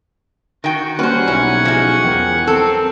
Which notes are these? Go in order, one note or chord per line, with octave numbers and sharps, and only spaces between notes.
D#3 F#4 G5
F#3 G3 A#3 C#4 B4 C5 F#5 G#5
B1 C#4 E4
F3 G#3
E2 A#4 G5
C4 A4